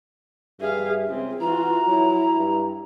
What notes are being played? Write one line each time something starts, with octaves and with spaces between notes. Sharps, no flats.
G2 G#4 E5 F5
C#2 C4 G#4
E3 F4 F#4 A#5
F#3 E4
G2